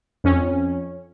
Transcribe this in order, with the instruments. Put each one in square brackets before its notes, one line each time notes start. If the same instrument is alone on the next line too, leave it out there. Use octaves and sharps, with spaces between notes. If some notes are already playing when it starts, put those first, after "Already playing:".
[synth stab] F2 C#4